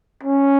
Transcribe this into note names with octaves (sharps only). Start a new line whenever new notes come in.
C#4